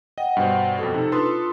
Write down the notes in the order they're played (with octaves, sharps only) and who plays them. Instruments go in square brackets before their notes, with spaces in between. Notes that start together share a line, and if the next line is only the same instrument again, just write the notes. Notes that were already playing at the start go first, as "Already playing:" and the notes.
[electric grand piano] D#5 [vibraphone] F#5 G5
[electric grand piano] G2 B2 C5
[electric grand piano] F2 B2 [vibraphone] A4 G5
[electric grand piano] C3 A4 [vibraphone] D#4
[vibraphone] D4 F4 D#6 [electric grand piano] A4 B4 C6